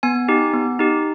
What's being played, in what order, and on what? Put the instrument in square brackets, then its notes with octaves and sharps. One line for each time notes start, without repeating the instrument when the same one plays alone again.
[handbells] B3 G#5
D#4 G4
B3
D#4 G4